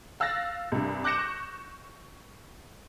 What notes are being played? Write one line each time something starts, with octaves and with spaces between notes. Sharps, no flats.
F5 E6 F#6 A6 A#6
C2 G2
D6 F#6 G6 A#6 C#7 E7
C#6